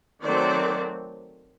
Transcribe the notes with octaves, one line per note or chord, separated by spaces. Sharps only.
D#3 F#3 A3 C4 C5 D5